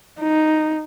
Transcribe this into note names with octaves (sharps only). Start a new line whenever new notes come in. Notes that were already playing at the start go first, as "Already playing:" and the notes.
D#4